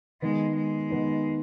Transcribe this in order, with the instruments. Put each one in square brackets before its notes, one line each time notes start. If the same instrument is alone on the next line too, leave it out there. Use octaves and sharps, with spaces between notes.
[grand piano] D#3 B3 D#4 [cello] G#3
[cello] G#3
[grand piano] D#3 B3 D#4